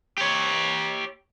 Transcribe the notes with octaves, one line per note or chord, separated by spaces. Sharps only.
G4 C#5